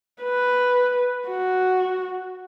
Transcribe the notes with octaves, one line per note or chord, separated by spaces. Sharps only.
B4
F#4